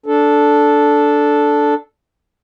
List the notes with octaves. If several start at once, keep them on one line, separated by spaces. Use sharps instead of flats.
D4 A4